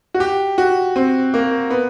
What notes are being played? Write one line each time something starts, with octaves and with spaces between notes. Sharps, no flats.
F#4
G4
F#4
C4
A#3
B3